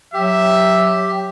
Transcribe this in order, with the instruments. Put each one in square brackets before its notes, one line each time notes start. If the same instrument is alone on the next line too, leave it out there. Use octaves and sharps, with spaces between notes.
[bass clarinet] F#3 [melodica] G4 [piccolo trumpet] E5